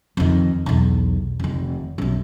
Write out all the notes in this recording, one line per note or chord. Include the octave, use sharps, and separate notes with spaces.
F2 D#3
B1 E2
F1 D#3
B1 F#2